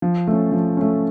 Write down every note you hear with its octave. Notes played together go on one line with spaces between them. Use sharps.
F3
A3 C#4
F3
A3 C#4